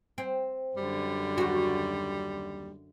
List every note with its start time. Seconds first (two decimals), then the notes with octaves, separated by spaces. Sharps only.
0.18 C4
0.77 F#2 D3 G3
1.38 D#2 F#4